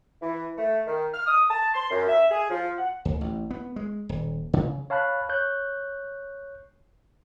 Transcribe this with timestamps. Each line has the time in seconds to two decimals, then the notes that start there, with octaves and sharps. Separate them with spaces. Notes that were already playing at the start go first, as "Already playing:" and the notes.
0.22 E3
0.57 A3
0.87 D#3
1.14 F6
1.26 D#6
1.49 A5
1.75 C6
1.91 F#2
2.08 E5
2.30 G#4
2.50 F3
2.78 F#5
3.05 D2
3.21 A1
3.51 B3
3.76 G#3
4.09 D#1
4.53 C#3
4.90 C#5 F5 A5 B5 F#6
5.29 C#5 F#6 G6